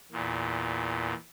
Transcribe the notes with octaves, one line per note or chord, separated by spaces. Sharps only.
E2 A#2